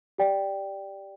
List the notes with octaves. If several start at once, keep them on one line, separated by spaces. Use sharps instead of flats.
G4 D5 G5